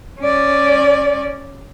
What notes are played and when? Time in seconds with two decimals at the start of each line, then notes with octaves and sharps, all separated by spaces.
0.20 C#4 D5